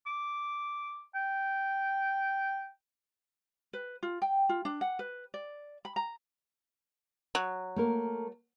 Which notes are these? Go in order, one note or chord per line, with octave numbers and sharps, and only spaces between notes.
D6
G5
B4
F4
G5
F4
D4
F#5
B4
D5
B5
A#5
F#3
A3 A#3 A#4